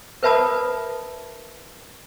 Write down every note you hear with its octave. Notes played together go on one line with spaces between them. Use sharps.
A#4 B4 E5 A5 B5 D#6